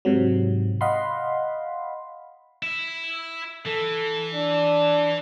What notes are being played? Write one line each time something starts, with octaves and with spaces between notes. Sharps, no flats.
G#2 C3 F#3
D#5 F5 F#5 B5 C6
E4
E3 A4
D4